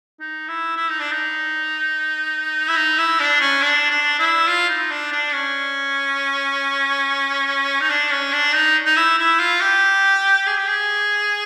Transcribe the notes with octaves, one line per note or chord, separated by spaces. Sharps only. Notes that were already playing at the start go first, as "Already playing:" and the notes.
D#4
E4
E4
D#4
D4
D#4
E4
D#4
E4
D4
C#4
D4
D4
E4
F4
D#4
D4
D4
C#4
D#4
D4
C#4
D4
D#4
D#4
E4
E4
F4
G4
G#4
G4
G#4